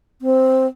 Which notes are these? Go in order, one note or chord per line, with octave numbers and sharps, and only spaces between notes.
C4